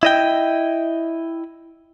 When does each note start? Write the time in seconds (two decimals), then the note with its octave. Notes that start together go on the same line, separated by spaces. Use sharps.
0.03 E4 D#5 G5